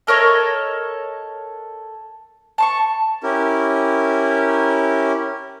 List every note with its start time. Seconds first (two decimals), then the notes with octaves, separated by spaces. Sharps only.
0.07 A4 A#4 C#5 D#5
2.58 A5 C6 C#6
3.23 C#4 E4 G4 A#4